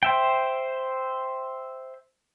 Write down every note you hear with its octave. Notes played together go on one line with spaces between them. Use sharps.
C5 E5 G5